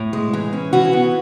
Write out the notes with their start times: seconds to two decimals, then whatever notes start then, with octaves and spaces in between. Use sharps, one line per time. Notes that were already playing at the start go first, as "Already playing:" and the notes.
Already playing: A2
0.13 G#3
0.33 E3
0.53 C#4
0.73 E3 F#4
0.93 B3